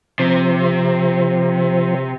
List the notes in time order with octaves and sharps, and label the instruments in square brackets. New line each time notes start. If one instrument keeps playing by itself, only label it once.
[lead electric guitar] C3 [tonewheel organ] F3 C5